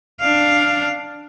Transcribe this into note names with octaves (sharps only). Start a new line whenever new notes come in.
D4 F5